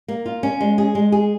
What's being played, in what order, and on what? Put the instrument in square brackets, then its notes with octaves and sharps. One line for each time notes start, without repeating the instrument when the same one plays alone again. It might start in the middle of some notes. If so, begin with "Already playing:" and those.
[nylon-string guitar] A#3
F4
C#4
G#3
G#4
G#3
G#4